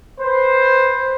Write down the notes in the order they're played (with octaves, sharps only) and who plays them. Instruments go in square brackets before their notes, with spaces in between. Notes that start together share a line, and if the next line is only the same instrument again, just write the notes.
[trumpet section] B4 C5